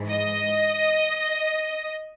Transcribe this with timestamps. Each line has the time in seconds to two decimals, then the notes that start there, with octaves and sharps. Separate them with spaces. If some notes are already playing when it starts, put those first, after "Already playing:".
Already playing: G#2 E3
0.08 D#5